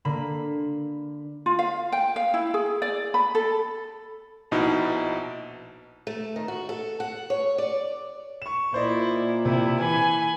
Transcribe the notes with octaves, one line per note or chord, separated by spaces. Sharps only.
D3 A#3 B5
F4
F5
G5
F5
E4
G#4
D5
B5
A4
A#1 B2 D#4 E4
A3
D#3
F#4
A4
F#5
C#5
D5
C#6 E7
A#2 E4 C5 D5 D#5
C3 E4
E3 G#5 B5